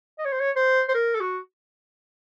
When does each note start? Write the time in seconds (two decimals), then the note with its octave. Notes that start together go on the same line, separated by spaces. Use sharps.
0.19 D#5
0.25 C#5
0.32 C5
0.40 C#5
0.56 C5
0.89 C5
0.94 A#4
1.15 A4
1.20 F#4